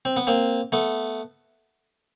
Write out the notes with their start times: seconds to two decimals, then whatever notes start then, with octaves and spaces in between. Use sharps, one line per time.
0.05 C4
0.17 B3
0.27 A#3 C4
0.72 A3 B3